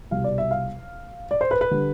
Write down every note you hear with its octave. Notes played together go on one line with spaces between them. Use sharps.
C2 B2 G3 F5
D5
E5
F5
D5
C5
B4
B4
D3 G3